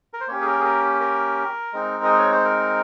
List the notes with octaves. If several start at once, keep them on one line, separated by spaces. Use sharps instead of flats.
A#4
C5
A#3 C#4 G4 C#5
G#4
A#4
G#4
A#4
A#4
G#3 C4 D#4
D#5
C#5
C5
A#4